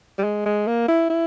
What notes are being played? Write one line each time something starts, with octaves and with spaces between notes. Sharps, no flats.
G3
G#3
G#3
A#3
E4
E4